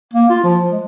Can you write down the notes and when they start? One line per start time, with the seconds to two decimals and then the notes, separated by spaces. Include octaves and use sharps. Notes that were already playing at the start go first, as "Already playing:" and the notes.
0.14 A#3
0.30 F4
0.44 F3
0.72 G#3